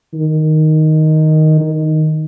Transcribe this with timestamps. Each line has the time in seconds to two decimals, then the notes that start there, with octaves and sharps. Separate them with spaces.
0.14 D#3
1.60 D#3